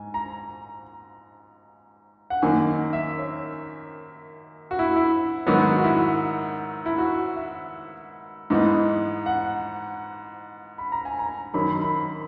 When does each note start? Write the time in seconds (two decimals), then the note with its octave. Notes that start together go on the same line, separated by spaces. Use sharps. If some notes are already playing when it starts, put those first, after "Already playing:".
Already playing: G#2 G#5
0.14 A#5
2.30 F#5
2.42 F#2 D#3 A#3 G#5
2.93 E5
3.18 C#5
4.71 F#4
4.79 E4
4.96 E4
5.47 G#2 D#3 F#3 B3 F#4
5.78 F#4
5.84 E4
6.86 E4
6.98 F#4
7.36 E5
8.50 G#2 E3 B3 D#4
9.26 F#5
10.78 B5
10.92 A#5
11.05 G#5
11.19 A#5
11.54 F#2 D#3 F#3 B5
11.82 B5